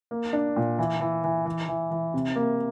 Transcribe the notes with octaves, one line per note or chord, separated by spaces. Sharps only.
A#3
D4
A#2
E3
E3
E3
E3
E3
E3
C3
A#3